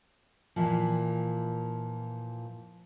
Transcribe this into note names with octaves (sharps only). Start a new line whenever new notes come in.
A#2 E3 F3